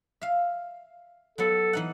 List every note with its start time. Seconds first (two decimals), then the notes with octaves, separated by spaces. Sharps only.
0.21 E5 F5
1.38 F#3 B3 A4
1.73 E3 D#4 F#5